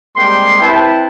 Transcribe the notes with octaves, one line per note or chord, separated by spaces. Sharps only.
G3 G#3 A#3 C4 G5 C6
C4 E4 B4 G5 A5